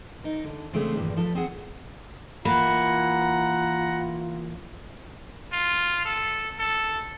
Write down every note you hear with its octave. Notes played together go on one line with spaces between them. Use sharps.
D#4 A#4
D3
C#3 G#3 A3 C4 D4
E2 G2 A#2 D#3
F3 A4 B4
C4 G#4 F#5
E3 A#3 F4 F#5 A#5 B5
F4
A4
A4